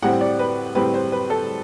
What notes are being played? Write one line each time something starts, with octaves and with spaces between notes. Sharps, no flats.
A2 G3 C4 F#5
D5
B4
A2 G3 C4 B4
C5
B4
A4